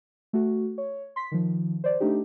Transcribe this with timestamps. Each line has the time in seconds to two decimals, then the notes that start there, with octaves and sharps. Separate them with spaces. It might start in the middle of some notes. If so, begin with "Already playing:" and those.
0.33 A3 F#4
0.78 C#5
1.16 C6 B6
1.32 D#3 F3
1.84 C5 D5
2.00 A3 D4 D#4 G4